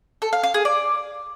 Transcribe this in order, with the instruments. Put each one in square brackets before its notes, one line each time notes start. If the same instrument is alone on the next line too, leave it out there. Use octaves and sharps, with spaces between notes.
[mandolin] A4
F5
F5
G#4
D5